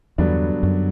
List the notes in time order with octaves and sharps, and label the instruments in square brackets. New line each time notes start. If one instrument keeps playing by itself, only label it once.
[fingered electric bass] E2 [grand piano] G2 D3 F#3 B3 D4
[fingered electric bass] F#2